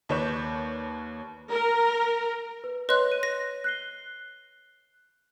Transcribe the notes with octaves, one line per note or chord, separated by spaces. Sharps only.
D#2 B4 C#5 D5 G6 E7
A#4
B4
B4 C#5 D#5 C6 F#6
C#5 D#7
A#6
F#6 C7 G7